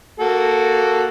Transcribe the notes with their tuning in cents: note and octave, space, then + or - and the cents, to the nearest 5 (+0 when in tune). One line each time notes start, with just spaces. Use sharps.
A#3 -10 F#4 +0 A4 +0